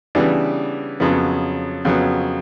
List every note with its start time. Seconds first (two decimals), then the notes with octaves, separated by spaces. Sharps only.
0.15 C#3 E3 G3 B3 D4
1.00 F2 C#3 F#3 B3
1.85 F2 C#3 F#3 B3